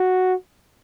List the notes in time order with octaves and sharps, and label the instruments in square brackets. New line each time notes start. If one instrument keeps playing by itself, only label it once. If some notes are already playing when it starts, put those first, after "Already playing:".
Already playing: [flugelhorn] F#4